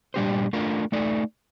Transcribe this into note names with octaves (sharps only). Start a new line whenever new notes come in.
A#2 G3 D4 G4 C5
A3 D4 F4 A#4
A3 D#4 A4 D5